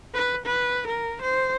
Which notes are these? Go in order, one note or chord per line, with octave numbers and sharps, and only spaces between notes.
B4
B4
A#4
C5